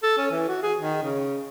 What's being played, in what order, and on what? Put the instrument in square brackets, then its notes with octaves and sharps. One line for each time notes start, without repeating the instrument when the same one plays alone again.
[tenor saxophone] A4
C#4
E3
F#4
G#4
D#3
C#3